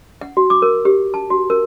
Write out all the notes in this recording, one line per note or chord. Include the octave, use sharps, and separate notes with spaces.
F#5
F#4
D6
A#4
G4
A5
F#4
A#4